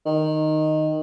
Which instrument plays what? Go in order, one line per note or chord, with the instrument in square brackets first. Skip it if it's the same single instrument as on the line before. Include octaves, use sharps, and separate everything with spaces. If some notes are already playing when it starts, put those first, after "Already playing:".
[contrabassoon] D#3